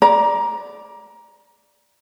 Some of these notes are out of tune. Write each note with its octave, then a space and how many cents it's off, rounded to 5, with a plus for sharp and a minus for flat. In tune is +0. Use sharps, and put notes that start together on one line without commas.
D5 +0 A#5 +20